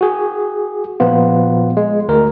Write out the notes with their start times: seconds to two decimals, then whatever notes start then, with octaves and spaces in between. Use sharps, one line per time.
0.01 F#4 G#4
1.00 A#2 F3 B3 F4
1.77 G#3
2.09 D2 A#4